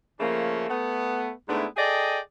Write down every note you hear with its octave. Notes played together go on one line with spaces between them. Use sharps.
C#3 F3 A3 A#3 C#4
A3 B3
G#2 A3 B3 D4 E4
G#4 A4 D5 D#5 G5